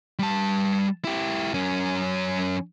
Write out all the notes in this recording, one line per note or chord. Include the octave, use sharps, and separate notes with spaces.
G3 A5
E4 G4
F#2 C#4